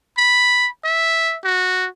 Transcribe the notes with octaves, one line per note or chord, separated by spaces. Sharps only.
B5
E5
F#4